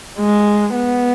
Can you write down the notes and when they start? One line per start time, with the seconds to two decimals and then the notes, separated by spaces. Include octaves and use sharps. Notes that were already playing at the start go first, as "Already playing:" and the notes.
0.19 G#3
0.74 B3